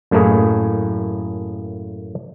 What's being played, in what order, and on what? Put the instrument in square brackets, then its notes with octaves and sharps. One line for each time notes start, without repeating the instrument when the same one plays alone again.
[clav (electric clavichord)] F#2 A2 A3 A#3 E4 G#4